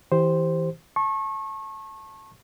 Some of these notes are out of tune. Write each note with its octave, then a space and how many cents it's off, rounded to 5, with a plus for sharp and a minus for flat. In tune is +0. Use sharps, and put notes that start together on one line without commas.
E3 -25 G4 -5 C5 +0
A5 +0 C#6 -30